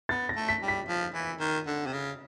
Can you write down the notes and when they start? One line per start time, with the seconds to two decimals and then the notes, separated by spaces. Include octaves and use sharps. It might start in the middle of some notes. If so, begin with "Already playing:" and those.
0.09 B3 A6
0.29 A#6
0.36 A3
0.49 B6
0.62 G3
0.68 B6
0.88 F3
1.14 E3
1.40 D#3
1.67 D3
1.86 C3
1.93 C#3